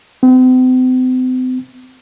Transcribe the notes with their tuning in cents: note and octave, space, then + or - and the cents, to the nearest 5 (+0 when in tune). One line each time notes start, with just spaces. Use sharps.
C4 -40